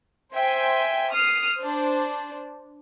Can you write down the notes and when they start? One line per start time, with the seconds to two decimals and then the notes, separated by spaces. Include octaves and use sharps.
0.32 C5 E5 G5 G#5
1.11 D#6 F6 C7
1.58 D4 C5